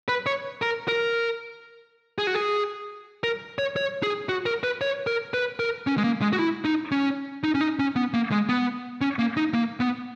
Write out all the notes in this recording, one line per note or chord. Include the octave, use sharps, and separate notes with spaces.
B4
C#5
A#4
A#4
G#4
F#4
G#4
A#4
C#5
C#5
G#4
F#4
A#4
B4
C#5
A#4
B4
A#4
C#4
G#3
A#3
G#3
F#4
E4
D#4
C#4
D#4
C#4
D#4
C#4
B3
A#3
G#3
B3
C#4
A#3
D#4
A#3
B3